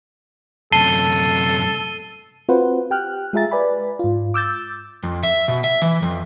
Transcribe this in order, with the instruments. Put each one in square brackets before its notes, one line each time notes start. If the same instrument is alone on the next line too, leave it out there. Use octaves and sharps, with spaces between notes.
[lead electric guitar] F#2 C3 [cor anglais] A4 [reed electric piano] A5 [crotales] C7 D#7 G7
[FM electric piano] C4 F4 F#4 B4 C5 F#5
G4 G5 F6 F#6
G#3 F4 G#4 E5 A#5 A6
B4 D5 G#5 B5
G#2 F4
D6 E6 G6 A6
[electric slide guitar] F2
E5
B2
E5
E3
F2